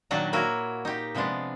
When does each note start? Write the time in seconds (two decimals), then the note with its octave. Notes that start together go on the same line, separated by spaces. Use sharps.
0.11 A#2 D#3 F#3 D4 F#5 A#5
0.33 A#3 E4 F#4 A#4 C#5
0.85 D#4 G4
1.15 C3 F3 G#3 B3 D4